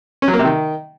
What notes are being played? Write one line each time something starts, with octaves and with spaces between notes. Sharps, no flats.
C#4
F#3
A#3
C3
D#3